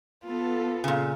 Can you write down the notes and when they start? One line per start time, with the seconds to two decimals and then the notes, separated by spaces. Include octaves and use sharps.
0.24 B3 F4 A4
0.84 A#2 C#3